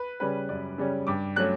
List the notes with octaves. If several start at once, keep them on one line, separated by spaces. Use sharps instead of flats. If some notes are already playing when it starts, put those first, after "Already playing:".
Already playing: B4
C#3 G3 C#4 B4
F#2 D5
C#3 G3 C#4
G2 D6
F#3 A3 C#4 F#6